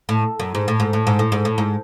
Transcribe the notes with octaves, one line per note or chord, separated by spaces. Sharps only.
A2
F#2
G#2
A2
G#2
A2
G#2
A2
G#2
A2
G#2